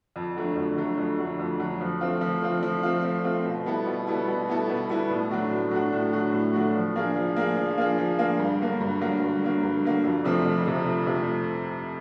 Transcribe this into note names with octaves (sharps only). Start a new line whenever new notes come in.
F2
D3 F#3 A3
F2
D3 F#3 A3
F2
D3 F#3 A3
F2
D3 F#3 A3
F3
A3 C4 F4
F3
A3 C4 F4
F3
A3 C4 F4
F3
A3 C4 F4
B2
G3 B3 E4 A4
B2
G3 B3 E4 A4
B2
G3 B3 E4 A4
B2
G3 B3 E4 A4
A2
F#3 A3 D4 F#4
A2
F#3 A3 D4 F#4
A2
F#3 A3 D4 F#4
A2
F#3 A3 D4 F#4
F3
A#3 D4 F4 G#4
F3
A#3 D4 F4 G#4
F3
A#3 D4 F4 G#4
F3
A#3 D4 F4 G#4
G2
D3 F#3 A#3
G2
D3 F#3 A#3
G2
D3 F#3 A#3
G2
D3 F#3 A#3
F2
C3 F3 A3 C4
F2
C3 F3 A3 C4
F2
C3 F3 A3